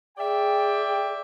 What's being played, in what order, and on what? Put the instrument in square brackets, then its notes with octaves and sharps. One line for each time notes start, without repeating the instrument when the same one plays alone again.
[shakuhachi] G#4 [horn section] D5 E5 G5